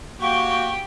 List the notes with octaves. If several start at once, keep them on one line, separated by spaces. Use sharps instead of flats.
A#3 F#4 G4 G5 C#6